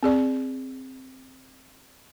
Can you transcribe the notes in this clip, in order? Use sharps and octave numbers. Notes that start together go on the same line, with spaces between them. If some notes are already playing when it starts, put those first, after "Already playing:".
C4 G#4 D5